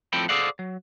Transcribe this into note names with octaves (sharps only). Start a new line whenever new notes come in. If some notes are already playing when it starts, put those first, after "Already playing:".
A2 F3 C4 A4 G5 B5
G#4 A4 C5 D5 F5 F#5
F#3